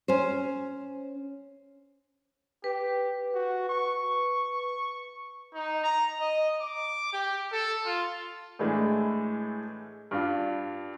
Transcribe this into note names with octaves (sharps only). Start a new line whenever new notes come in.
C#4 C5
G4 B4
F#4
C#6
D#4
A#5
D#5
D6
G4
A4
F4
A2 E3 G#3 A3 D4
G2 D4 F4